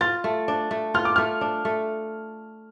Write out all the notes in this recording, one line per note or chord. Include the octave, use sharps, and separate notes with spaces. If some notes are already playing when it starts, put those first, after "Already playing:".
F4 A6
A3
D4
A3
F4 F6
D6
A3 F6
D4
A3